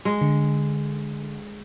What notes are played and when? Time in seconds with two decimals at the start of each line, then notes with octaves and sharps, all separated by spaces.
0.05 G#3
0.21 D3